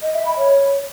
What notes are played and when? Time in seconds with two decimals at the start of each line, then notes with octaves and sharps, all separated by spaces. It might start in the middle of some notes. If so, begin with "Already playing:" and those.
0.02 D#5
0.14 E5
0.25 B5
0.37 C#5